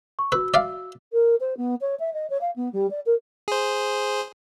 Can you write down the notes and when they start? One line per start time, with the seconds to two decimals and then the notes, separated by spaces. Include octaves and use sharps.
0.19 C#6
0.32 F#4 B4 E6
0.54 D5 E5 F5
1.12 A#4
1.40 C5
1.57 B3
1.81 C#5
1.99 E5
2.13 D#5
2.29 C#5
2.41 F5
2.55 B3
2.72 G3
2.90 D5
3.06 A#4
3.48 G#4 C5